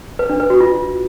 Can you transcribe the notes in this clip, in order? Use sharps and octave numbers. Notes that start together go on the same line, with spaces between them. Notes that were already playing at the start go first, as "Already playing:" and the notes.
B4
D4
B4
F#4
F4